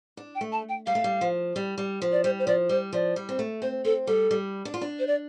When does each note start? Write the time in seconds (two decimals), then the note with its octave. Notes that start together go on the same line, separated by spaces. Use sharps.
0.17 D4
0.35 G5
0.41 A3
0.52 A5
0.69 G5
0.86 G3 F5
0.95 A3
1.04 G3
1.21 F3
1.56 G3
1.78 G3
2.02 F3
2.12 D5
2.24 G3 C5
2.39 C5
2.47 F3 D5
2.69 G3 C5
2.93 F3 D5
3.16 G3
3.29 C4
3.39 A3
3.62 C4 C5
3.85 C4 A4
4.07 G3 A4
4.31 G3
4.65 D4
4.74 F4
4.81 D4
4.99 C5
5.07 D5